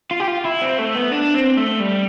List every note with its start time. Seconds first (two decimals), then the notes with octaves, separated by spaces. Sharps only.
0.11 F4
0.20 G4
0.28 F4
0.45 E4
0.62 C4
0.79 A3
0.95 B3
1.12 D4
1.35 C4
1.57 A3
1.80 G3